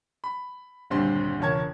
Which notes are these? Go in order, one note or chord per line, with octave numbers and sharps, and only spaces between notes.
B5
D#1 D2 G2 G3 C4 C6
E1 C#2 A#4 C#5 A5 G#6